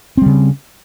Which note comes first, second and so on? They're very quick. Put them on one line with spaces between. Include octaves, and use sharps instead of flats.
C4 G3 C#3